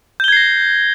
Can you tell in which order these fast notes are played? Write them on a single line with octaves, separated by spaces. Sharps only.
G6 G7 G#6 C7 A#6